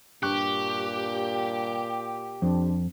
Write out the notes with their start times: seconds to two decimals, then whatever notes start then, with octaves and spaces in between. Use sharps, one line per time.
0.23 G2 A#2 G4 C#6 F#6
2.42 F2 C4 D4